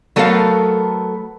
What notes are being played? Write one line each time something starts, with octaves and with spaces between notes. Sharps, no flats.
F#3 A3 B3 A4 A#4 F5